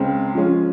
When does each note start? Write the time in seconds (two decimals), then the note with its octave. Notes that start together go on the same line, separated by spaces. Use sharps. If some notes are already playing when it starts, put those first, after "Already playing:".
Already playing: C#2 C#3 G#3 C4
0.35 F3 G#3 C#4 F4